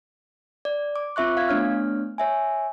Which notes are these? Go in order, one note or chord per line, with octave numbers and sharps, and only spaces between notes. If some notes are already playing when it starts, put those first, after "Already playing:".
D5
D6
C4 F4 E5 C#6 F#6
F5 G#6
A3 B3 D4 C#5 F6
C#5 E5 G#5